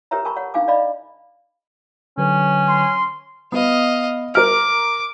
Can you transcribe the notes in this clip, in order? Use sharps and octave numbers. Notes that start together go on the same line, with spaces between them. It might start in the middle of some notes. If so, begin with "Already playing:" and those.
G4 A#4 B4 C#5 E5 A#5
A#4 B4 G#5 A5 B5 C#6
C#5 F#5
D4 D#4 F5 G#5 D6
D5 D#5 F5 B5
D3 F#3 C#4 B4
C6
B3 D#5 F5
A#4 D6 F6